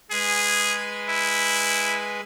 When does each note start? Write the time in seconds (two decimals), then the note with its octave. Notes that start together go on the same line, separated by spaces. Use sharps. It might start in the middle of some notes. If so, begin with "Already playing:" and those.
0.11 G#3 G#4 B4 G#5
1.09 E4